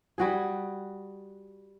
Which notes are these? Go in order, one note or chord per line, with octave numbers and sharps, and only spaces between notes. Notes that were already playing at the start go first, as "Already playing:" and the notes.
G3 F#4 G#4